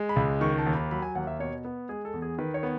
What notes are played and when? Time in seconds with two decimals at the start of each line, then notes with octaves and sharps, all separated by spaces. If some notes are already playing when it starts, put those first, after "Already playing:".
Already playing: G#3
0.09 B5
0.16 C#2
0.41 D#3 C#6
0.58 A5
0.66 D#2
0.74 B5
0.91 F#3 B5
1.02 G#5
1.15 D#2 F#5
1.27 E5
1.40 B2 C#5
1.65 B3
1.89 G#3 G#4
2.05 A4
2.14 E2
2.22 G#4
2.38 D#3 B4
2.54 C#5
2.63 B3